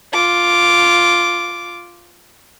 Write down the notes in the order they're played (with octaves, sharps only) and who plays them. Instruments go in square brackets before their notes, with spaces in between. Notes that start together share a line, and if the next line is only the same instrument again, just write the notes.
[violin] F4 D6